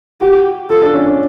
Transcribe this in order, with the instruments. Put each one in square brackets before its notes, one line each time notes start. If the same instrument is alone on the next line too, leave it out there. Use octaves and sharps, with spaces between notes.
[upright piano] F#4 [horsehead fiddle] G4
[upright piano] F4 [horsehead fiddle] A4
[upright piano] D4
C#4
D4